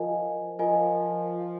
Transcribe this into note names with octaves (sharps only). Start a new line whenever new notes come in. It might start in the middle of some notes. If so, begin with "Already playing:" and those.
Already playing: F3 F4 A#4 D#5 G#5
F3 F4 A#4 D#5 G#5